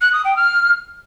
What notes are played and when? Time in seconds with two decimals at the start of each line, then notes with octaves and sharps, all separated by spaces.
0.01 F#6
0.13 D#6
0.25 G5
0.37 F6